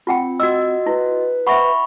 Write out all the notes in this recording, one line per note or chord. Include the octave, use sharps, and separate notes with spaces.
C4 F4 F#5 G5
F#4 D#5 E6
E4 B4
C5 E5 F#5 B5 C#6